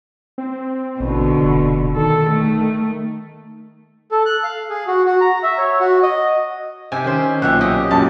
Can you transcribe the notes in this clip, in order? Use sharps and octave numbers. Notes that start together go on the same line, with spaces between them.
C4
A1 B2 D3
F1
D#3 A4
A3
A4
F#6
F5
G#4
F#4
F#4
A#5
E5
C#5
F#4
D#5
C3 D#4 G4 G#5
D#3 C#4 C5
B1 A#2 G4 E5 F#5
C#4 G4 D#5
C#2 F#2 A#2 A5